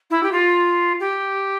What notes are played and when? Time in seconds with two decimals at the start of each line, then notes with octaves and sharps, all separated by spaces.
0.10 E4
0.23 G4
0.32 F4
0.99 G4